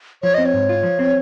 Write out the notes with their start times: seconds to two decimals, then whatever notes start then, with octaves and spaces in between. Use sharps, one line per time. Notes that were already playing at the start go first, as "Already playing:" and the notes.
0.22 F3 C#5
0.34 C4 D#5
0.45 C#5
0.54 G#2
0.69 F4
0.83 F3
0.99 C4